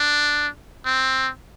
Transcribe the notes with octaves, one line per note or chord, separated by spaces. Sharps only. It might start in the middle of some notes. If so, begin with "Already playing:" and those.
Already playing: D4
C4